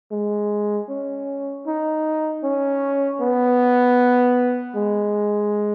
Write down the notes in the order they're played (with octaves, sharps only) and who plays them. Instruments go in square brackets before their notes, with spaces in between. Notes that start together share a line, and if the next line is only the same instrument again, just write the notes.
[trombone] G#3
C#4
D#4
C#4
B3
G#3